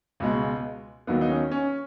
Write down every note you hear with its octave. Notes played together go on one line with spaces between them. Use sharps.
C#2 B2 G#3
D#2 D#3 F#3 B3
D#4
C#4
C#4